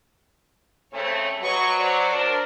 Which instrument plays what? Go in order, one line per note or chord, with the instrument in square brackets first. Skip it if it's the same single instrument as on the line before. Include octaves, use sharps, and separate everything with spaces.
[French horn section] C#3 A3 C4 [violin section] C#5
[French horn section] F#3 [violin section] B4 D#5 C#6
[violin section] C5 D5
[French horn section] D4 A#4